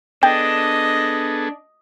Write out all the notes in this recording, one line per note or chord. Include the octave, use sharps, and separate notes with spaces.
B3 D4 G#4 A4 D#5 G5